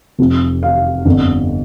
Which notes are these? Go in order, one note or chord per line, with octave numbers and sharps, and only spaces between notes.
F1 F2 F3
F5
G1 F2 D3